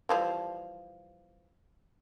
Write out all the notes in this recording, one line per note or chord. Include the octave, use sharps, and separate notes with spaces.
E3 F3 G3